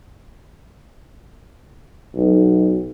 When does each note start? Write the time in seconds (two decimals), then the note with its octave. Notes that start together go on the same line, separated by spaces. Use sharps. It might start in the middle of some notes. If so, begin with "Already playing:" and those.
2.15 B1